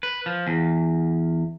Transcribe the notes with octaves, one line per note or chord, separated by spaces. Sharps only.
B4
F3
E2